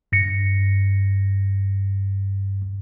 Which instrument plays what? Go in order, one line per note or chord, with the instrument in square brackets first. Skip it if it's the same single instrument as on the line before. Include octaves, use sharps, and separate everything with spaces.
[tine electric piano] G2 A#6 C#7